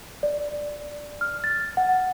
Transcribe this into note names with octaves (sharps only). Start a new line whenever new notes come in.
D5
F6
A6
F#5